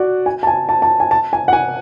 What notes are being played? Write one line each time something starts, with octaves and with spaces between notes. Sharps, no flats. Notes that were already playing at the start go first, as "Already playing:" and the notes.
Already playing: F#4 D5
G#5
A5
G#5
A5
A5
G#5
A5
G#5
F#5
G#5